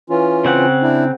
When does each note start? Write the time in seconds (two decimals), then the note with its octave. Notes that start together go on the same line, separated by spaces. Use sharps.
0.10 E3 C#4 F4
0.45 C#3 C4 F#5
0.83 D4 E4